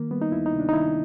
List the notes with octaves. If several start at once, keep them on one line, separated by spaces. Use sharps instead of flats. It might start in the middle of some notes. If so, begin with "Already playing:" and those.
Already playing: D#3 A#3
G3 B3
D#4
D2 E4
D#4
C3
D4
D#4
D#3 E4